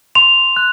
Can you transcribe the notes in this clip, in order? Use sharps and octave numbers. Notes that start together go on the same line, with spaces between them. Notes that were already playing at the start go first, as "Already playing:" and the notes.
C6 F7
F#6